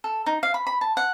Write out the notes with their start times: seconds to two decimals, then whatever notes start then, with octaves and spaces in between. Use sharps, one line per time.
0.04 A4
0.26 D#4
0.43 F5
0.54 B5
0.67 B5
0.81 A5
0.97 F#5